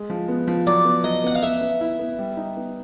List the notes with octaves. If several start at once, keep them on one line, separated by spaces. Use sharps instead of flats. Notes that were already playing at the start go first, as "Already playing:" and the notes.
Already playing: G#3
F3
B3
F3
F#3 D5
B3
F#3 D#5
B3 F#5
F5
B3 E5
B3
E4
B3
G3
D#4
B3